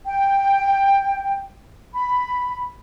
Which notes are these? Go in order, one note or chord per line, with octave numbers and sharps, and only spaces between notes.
G5
B5